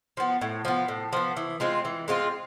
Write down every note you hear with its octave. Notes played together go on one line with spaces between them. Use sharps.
F3 B3
A2
F3 B3
A2
F3 B3
E3
G#3 C4 F4
E3
G#3 C4 F4